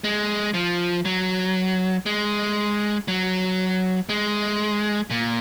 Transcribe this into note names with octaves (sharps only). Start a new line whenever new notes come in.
G#3
F3
F#3
G#3
F#3
G#3
A#2